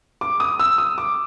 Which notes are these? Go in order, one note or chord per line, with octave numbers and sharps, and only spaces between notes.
D6
D#6
E6
D#6
D6